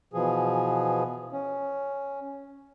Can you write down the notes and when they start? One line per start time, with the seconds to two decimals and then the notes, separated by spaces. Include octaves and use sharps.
0.13 B2 E3 F3 G#4
1.32 C#4